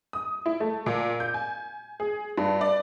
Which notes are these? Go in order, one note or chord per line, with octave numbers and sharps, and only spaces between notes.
D#6
E4
A3
A#2
G6
G#5
G#4
G2
D5